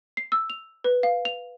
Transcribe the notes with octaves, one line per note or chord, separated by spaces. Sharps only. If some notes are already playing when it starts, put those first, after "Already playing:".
C7
E6
F7
B4
F5
F7